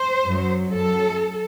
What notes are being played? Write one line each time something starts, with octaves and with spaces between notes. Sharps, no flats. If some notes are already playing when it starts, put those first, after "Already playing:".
Already playing: C5
F#2 F#3
F#2 F#3 A4